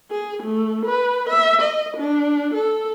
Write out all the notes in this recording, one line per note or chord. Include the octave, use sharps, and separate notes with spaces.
G#4
A3
B4
E5
D#5
D4
A4